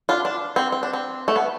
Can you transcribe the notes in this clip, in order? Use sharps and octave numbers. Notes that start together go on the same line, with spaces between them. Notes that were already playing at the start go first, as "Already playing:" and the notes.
D4 F4
D4
C4
C4
D4
C4
A3
B3